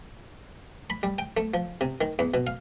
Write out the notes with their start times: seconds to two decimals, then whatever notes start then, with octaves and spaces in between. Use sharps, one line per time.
0.90 B5
1.03 G3
1.18 G5
1.37 A3
1.54 F3
1.81 C3
2.01 D#3
2.19 E2
2.34 B2
2.47 F5